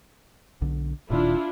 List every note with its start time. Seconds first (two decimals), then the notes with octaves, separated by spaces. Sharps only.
0.61 B1 D3
1.10 D1 A#2 D#3 D4 E4 F4